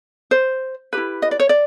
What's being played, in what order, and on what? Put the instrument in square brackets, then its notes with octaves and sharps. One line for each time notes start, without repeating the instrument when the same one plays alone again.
[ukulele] C5
E4 G4 B4
D#5
D5
C#5
D5